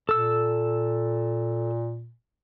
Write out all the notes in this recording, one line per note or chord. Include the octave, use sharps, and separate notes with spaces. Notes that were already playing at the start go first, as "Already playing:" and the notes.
A#2 A4 E6